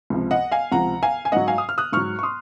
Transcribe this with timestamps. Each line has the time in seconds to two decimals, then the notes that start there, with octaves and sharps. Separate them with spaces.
0.10 C#2 C3 F3
0.31 D#5 F#5
0.52 F5 G#5
0.72 C#2 C3 F3 F#5 A#5
1.03 F5 G#5
1.25 G#5
1.32 G#2 F#3 D#5 F#5
1.48 F5 G#5
1.58 D#6
1.69 F6
1.78 D#6 F#6
1.92 G#2 F#3 C#6 F6
2.19 C#6
2.23 C6 D#6